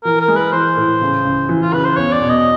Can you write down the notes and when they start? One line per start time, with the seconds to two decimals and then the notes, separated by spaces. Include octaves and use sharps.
0.04 E3 A#4
0.20 A#4
0.28 G#3
0.36 B4
0.52 E3 C5
0.77 A2
1.01 C#3
1.25 C#2
1.49 E3
1.62 F4
1.73 C#3 B4
1.84 C5
1.97 E2 C#5
2.12 D5
2.21 B2
2.30 D#5